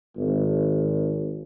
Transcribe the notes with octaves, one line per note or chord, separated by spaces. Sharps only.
G#1